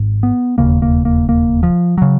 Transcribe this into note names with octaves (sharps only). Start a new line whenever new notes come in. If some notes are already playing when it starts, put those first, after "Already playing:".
Already playing: G#1 G#2
B3
E1 D#2 C#3 A#3
A#3
A#3
A#3
F3
C#3 F#3